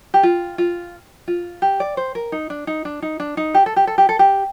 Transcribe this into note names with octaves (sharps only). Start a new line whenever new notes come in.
G4
F4
F4
F4
G4
D5
C5
A#4
D#4
D4
D#4
D4
D#4
D4
D#4
G4
A4
G4
A4
G4
A4
G4